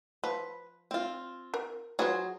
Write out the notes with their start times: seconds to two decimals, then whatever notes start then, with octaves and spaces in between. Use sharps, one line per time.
0.24 F3 B4
0.91 C4 F4
1.54 A#4
1.99 F#3 F4 G#4 B4 C5